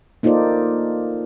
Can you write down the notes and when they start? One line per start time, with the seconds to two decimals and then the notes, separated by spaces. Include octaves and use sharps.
0.23 A#3 D#4 F4 A4 C5 D5